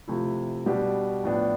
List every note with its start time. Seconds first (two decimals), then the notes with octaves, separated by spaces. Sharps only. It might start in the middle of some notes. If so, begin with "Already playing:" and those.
0.08 C3 F3 A3 E4
0.66 B2 G3 D4 G4 D5
1.24 A2 F3 B3 D4